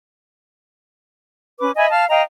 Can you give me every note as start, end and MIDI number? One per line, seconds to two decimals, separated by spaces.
1.60 1.71 61
1.60 1.71 71
1.60 1.71 86
1.76 1.89 75
1.76 1.89 76
1.76 1.89 80
1.76 1.89 83
1.90 2.06 77
1.90 2.06 81
1.90 2.06 89
2.10 2.21 75
2.10 2.21 77
2.10 2.21 79
2.10 2.21 82